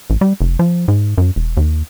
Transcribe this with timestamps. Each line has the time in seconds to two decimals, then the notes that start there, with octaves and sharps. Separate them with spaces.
0.10 A1
0.21 G3
0.41 F1
0.59 F3
0.88 G#2
1.18 F#2
1.36 E1
1.57 D#2